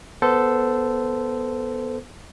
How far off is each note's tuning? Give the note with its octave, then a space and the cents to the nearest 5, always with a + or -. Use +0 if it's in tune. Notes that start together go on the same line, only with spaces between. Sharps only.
B3 -10 A4 +0 C5 -20